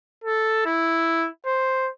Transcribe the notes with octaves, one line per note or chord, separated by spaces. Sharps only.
A4
E4
C5